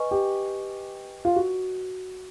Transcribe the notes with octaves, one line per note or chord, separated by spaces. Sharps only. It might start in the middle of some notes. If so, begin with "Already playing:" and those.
Already playing: B4 D#5 G#5 C#6
G4
F4
F#4